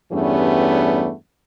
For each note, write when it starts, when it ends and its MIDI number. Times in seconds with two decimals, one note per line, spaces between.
0.12 1.12 40
0.12 1.12 43
0.12 1.12 55
0.12 1.12 57
0.12 1.12 59
0.12 1.12 61